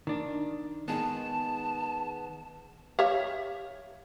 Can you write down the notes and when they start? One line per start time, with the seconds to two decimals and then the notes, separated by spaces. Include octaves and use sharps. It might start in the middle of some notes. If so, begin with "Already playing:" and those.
0.07 D#3 D4
0.88 D#3 G#3 B3 A5
2.99 G4 C#5 E5 F5